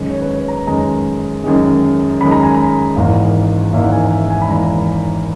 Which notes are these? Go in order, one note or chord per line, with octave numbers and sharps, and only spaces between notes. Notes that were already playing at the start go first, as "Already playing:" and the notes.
Already playing: F#2 D#3 G#3
C#5
B4
C#5
A#5
F#2 D#3 G#3 A#5
F#2 D#3 G#3
F#2 D#3 G#3 B5
A#5
G#5
A#5
G#1 G#2 E3 A#3
G#1 G#2 E3 A#3 E5
F#5
G#5
E5
G#5
B5
G#1 G#2 E3 A#3 A#5
A#5